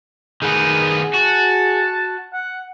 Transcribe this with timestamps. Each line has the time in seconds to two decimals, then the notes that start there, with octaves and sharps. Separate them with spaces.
0.42 D#3 B3 G#4
1.14 F#4 A5
2.33 F#5